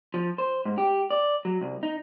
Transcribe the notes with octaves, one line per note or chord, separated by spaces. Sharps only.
F3
C5
G#2
G4
D5
F#3
C2
D#4